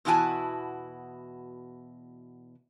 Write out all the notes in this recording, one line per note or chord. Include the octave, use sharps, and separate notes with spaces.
E2 B2 E4 F#4 G#5 A5